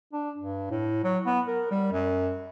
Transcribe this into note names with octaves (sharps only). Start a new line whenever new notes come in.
D4
G2
A2
F#3
B3
A#4
G3
F#2